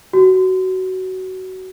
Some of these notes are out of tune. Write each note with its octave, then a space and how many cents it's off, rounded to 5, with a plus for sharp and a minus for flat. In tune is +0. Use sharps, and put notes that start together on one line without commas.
F#4 +15